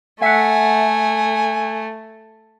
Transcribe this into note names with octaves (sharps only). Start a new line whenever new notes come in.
A3 E5 F#5 G#5